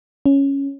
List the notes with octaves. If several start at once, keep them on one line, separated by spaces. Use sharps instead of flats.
C#4